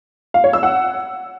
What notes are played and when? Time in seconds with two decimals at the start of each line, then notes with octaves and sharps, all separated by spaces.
0.34 F5
0.44 C#5
0.53 E6
0.63 F#5